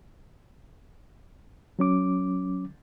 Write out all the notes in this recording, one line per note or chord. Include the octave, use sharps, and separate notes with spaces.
F#3 C#4 D6